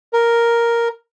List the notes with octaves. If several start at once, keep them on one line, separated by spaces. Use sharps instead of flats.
A#4